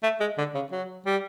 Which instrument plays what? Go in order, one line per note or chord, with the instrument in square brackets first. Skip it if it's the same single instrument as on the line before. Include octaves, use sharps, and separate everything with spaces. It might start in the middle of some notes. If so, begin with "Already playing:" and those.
[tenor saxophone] A3
G#3
D3
C#3
F#3
G3